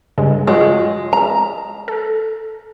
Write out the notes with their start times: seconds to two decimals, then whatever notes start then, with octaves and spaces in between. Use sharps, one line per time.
0.18 G2 C#3 G#3
0.47 G#3 F4 F#4 C#5
1.13 A#5
1.88 A4